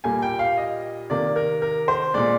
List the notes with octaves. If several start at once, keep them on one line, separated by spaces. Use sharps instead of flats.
A#2 G3 A#3 G#5
G5
F5
D#5
C3 D#3 A#3 D5
A#4
A#4
C5
A#2 G#3 D5